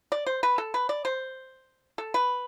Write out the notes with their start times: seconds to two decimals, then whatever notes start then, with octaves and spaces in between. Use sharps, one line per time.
0.12 D5
0.26 C5
0.43 B4
0.58 A4
0.74 B4
0.89 D5
1.05 C5
1.98 A4
2.14 B4